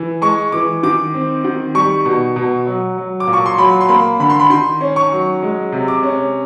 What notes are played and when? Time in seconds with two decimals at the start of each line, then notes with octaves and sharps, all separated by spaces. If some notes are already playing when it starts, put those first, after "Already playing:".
Already playing: E3
0.22 G#3 C#6
0.52 E3 D6
0.83 D#3 D6
1.14 C4
1.44 D#3
1.75 G3 C#6
2.05 B2
2.36 B2
2.66 F#3
2.97 F#3
3.20 D6
3.27 A#2
3.33 C#6
3.46 C6
3.58 F#3 B5
3.81 C6
3.89 A#3 B5
4.19 D3 B5
4.30 C6
4.39 B5
4.50 D#3 C6
4.81 C#4
4.96 C#6
5.12 F#3
5.43 G#3
5.72 C3
5.88 D6
6.03 C#4